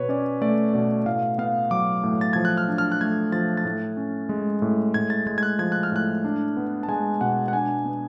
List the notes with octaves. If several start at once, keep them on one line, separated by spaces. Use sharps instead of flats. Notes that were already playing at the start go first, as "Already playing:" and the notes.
Already playing: B2 B4 C#5
C#4 D5
A3 D5
B2 D5
A2 F5
B3 F5
F#3 D6
A2
A6
F3 G#6
F#6
F6
D4
F6
F#6
A3 G#6
F3 A6
A6
A2
C#4
G#3
A2
A2 G#6
A6
G#3 G#6
G#6
F#6
F3 G#6
F#6
F6
A2 F#6
D4
B3
A5
G#3 G#5
B2 F#5
F#5
D4 G#5
B3